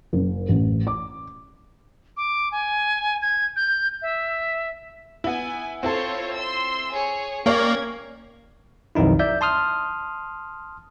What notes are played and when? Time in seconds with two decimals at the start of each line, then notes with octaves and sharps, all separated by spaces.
0.13 F#1
0.49 A1
0.87 D6
2.17 D6
2.52 G#5
3.22 G#6
3.56 G6
4.02 E5
5.24 B3 E4 G#5
5.83 C4 E4 F4 A4 C5 C#5
6.35 C6 E6
6.90 G#4 C#5
7.46 A#3 C#4 G4 C#5 D5 G#6
8.95 B1 F2 D#3 D#4 E4
9.19 D5 E5 G6
9.41 A5 C6 D#6 F6